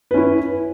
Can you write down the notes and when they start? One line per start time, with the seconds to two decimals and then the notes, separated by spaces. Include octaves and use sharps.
0.11 B4
0.14 C#4
0.17 E4